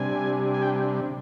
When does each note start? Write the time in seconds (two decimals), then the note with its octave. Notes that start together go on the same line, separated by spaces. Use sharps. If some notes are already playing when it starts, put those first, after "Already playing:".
Already playing: C3 G3 D4 G#5
0.54 G#5
0.62 G5